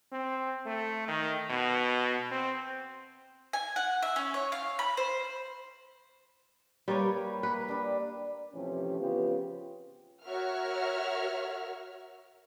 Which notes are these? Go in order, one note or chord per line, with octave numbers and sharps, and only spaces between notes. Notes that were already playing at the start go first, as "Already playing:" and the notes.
C4
A3
D#3
B2
C4
G#5
F#5
E5
C#4
C#5
F5
B5
C5
G3 A#3 B4 C#5 G5
A#3 B4
G3 D4
A2 C3 E3 F3 C#4 G4
C#3 F3 B3 F4 G4 B4
F#4 A#4 C#5 E5 F6